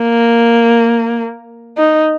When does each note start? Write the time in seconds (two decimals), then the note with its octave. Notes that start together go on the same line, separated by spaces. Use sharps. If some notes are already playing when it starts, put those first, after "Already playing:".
Already playing: A#3
1.77 D#4